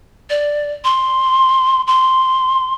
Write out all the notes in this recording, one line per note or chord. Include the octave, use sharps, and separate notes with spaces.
D5
C6
C6